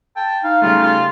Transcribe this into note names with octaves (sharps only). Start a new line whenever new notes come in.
G5 A5
D#4 F5
C#3 G3 A3 F4
F4